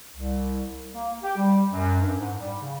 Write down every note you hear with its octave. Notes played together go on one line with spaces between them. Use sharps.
C2
A#3
G4
G3
F#2
G2
G#2
G3
C#3